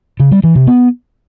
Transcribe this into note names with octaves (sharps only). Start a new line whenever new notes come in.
C#3
G3
E3
C3
B3